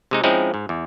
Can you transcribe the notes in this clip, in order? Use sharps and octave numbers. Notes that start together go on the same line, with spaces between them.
C3 G#3 D#4
F3 G#3 C4 C#4 D#4 E4
G#2
E2